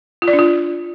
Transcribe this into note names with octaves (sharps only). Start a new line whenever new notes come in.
F4
D5
D4
F4